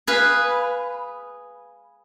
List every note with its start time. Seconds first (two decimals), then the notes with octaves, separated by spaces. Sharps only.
0.07 G#4 B4 F5